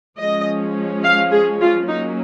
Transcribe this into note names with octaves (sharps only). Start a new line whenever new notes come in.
F3 G#3 C#4 D#5
F5
G#4
F4
F#3 A#3 C#4 D#4